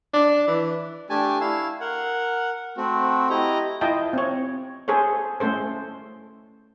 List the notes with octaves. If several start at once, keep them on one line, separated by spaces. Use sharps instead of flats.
D4
E3
A3 D4 G4 G#5 A5
E4 F5 E6
A#4 F#5
A3 C4 F#4
E4 G4 D#5 A#5
E4 F4 D#5 G5 A5
C4 C#5
G#4 A4 C5 C#5
A3 C#4 A4 C5